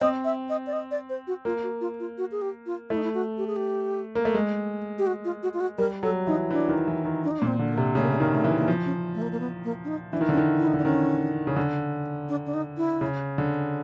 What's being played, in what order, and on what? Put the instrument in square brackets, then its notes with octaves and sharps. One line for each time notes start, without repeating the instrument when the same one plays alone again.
[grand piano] C4 [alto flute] D#5
[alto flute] E5
D#5
D5
D#5
D5
C5
F#4
[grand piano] A#3 [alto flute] F4
[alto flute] F#4
F4
F4
F#4
G#4
G4
F4
[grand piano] A3 [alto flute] E4
[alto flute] D#4
E4
F#4
G4
G#4
G4
[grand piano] A#3
A3
G#3
[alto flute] G4
F#4
F4
F#4
F4
F#4
[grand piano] G3 [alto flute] A#4
[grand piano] F#3 [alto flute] A4
[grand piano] E3 [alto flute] D#4
[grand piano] E3 [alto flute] D4
[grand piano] D#3
E3
D#3
[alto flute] D4
D#4
D4
[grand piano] A#2
[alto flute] C4
[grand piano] D3
[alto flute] A#3
[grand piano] C3
[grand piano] C#3 [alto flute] A3
[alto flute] A#3
A3
[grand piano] D#3 [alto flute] A#3
[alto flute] A3
[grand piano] E3 [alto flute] A#3
[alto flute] A#3
[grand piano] F3 [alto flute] B3
[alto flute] C#4
A3
A#3
A#3
B3
A#3
D4
D#4
[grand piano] E3 [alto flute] D4
[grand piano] D#3
[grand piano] D3 [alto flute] C#4
[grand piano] D#3
[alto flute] E4
D#4
[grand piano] D3 [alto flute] D4
[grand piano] D#3 [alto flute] C#4
[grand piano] C#3
D3
[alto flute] D4
D4
D#4
E4
[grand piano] C#3
D3